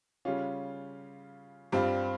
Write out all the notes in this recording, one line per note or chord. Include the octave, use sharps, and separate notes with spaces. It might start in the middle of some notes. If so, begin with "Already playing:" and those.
C#3 G3 C#4 F4
G2 G3 C4 F4